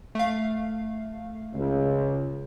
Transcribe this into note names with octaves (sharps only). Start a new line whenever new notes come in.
A3 F5
C#2